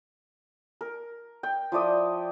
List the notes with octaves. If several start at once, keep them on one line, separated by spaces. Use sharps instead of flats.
A#4
G5
F3 E4 D5 D#6